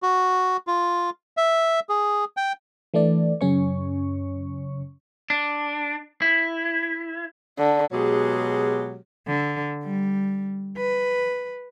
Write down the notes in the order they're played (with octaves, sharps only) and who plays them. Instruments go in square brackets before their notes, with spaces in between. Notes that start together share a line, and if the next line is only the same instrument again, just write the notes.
[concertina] F#4
F4
E5
G#4
G5
[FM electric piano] E3 A3 D4 D5
F#2 C#3 C#4 C#5 C#6
[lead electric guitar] D4
E4
[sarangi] D3
[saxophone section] B2 F#3 G#3 G4 G#4 C#5
[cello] D3
G3
B4